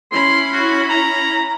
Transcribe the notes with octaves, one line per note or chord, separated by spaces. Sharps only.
C#4 E4 B5 C6
F#4
A#5